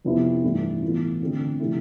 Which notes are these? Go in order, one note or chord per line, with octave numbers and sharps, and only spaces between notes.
F2 C3 F3 B3 E4
G2 E3 A3 E4
A2 E3 B3 F4
D3 A3 C4 F4
C3 F3 A3 E4